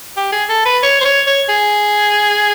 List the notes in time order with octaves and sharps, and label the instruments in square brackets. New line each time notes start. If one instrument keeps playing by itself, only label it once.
[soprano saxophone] G4
G#4
A4
B4
C#5
C5
C#5
C#5
G#4